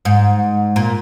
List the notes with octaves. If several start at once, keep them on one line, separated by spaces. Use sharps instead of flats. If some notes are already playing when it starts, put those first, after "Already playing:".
G#2
A#2